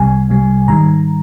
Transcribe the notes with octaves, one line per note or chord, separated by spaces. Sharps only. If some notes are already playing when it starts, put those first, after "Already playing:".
Already playing: C2 C3 G3 G#5
C2 C3 G3
G#2 D#3 G3 A#5